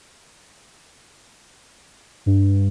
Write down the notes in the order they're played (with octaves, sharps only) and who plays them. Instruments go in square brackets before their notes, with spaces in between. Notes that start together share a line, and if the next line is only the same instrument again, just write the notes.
[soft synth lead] G2